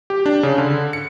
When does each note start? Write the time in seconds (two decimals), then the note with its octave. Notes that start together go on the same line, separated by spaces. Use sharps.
0.10 G4
0.26 D4
0.43 C#3
0.58 D3
0.93 C#7